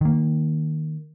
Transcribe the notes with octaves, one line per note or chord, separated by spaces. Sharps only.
D#3 A#3